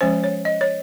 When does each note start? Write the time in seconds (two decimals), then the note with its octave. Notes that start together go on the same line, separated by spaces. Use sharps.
0.01 F3 G#3 C#4 C5
0.24 C#5
0.45 D#5
0.61 C#5